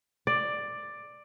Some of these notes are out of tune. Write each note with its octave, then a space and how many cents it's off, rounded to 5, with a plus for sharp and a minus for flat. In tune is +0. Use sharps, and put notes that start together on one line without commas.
D5 +10